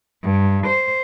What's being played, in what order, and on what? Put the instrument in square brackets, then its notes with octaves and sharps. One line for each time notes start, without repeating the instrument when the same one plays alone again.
[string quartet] G2
C5